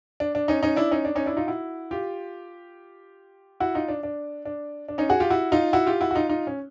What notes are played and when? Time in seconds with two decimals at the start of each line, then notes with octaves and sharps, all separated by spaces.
0.20 D4
0.35 D4
0.48 C#4 D#4
0.63 C#4 D#4
0.76 D4 E4
0.91 C#4 D#4
1.05 D4
1.15 C#4 D#4
1.26 D4 E4
1.37 D#4 F4
1.47 E4 F#4
1.91 F4 G4
3.60 E4 F#4
3.75 D#4 F4
3.88 D4
4.03 D4
4.45 D4
4.88 D4
4.98 C#4 D#4
5.09 F#4 G#4
5.20 F4 G4
5.30 E4 F#4
5.52 D#4 F4
5.73 E4 F#4
5.87 F4 G4
6.01 E4 F#4
6.11 F#4
6.15 D#4 F4
6.29 D#4 F4
6.47 C#4